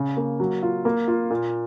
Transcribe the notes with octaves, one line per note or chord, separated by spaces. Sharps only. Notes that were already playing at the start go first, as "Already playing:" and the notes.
Already playing: C#3
A#3
F#3
F4
A#3
F4
A#2